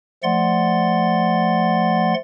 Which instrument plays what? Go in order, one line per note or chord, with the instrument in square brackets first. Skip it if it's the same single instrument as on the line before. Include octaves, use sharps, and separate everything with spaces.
[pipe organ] F3 A3 D5 F#5 C6 A6